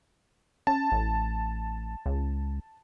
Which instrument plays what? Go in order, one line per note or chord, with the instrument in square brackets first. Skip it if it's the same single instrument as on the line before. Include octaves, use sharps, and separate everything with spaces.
[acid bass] C#4 [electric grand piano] A5
[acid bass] A1
C#2